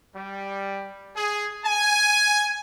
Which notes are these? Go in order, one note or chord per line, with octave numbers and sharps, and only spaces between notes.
G3
G#4
G#5